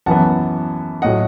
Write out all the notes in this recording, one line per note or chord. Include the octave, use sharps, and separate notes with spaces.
F#2 E3 B3 F#5 A5
A2 F#3 D#5 F#5